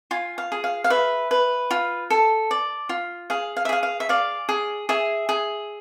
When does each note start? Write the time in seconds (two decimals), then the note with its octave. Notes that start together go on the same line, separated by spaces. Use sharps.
0.11 F4 G#5
0.38 F5
0.52 G#4
0.64 F5
0.84 F5
0.90 B4 E5
1.31 B4
1.71 F4
2.10 A4
2.51 D5
2.89 F4
3.30 G#4 F5
3.57 F5
3.65 E5
3.69 G#4 F5
3.83 F5
4.00 E5
4.09 D5 F5
4.49 G#4
4.89 G#4 E5
5.29 G#4